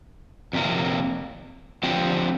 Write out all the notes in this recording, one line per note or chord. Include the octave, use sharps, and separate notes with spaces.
F2 C3 A#3
D3 F3 C4 G4